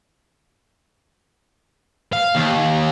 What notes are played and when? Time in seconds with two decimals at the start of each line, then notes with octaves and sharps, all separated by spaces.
2.13 F5
2.35 D#2